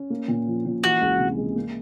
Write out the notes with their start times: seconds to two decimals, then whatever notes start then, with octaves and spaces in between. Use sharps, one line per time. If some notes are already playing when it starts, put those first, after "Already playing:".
Already playing: C#4
0.10 A#3
0.28 A#2
0.47 F3
0.66 A#2
0.83 E3 F#4
1.01 C#2
1.19 C3
1.38 G#3
1.56 A#3